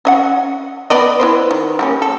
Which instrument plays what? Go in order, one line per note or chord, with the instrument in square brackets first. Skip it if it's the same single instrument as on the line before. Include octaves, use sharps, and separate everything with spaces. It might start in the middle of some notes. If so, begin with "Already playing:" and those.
[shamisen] C#4 D#5 F#5
B3 D5 D#5
E4 B4 C5
D#3
G3 A#3 C#4
A4